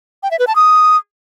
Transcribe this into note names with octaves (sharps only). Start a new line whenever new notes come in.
G5
E5
B4
A5
D#6